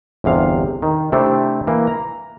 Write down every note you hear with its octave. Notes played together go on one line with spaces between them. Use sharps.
G1 E2 C3 F5
D#3
C3 A3 C4 D4 E4
E3 A#3
A#5